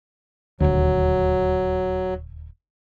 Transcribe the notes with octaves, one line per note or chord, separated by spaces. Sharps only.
D#1 D2 F#3